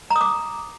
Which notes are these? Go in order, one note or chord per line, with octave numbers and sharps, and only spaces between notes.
A#5
D#6
D6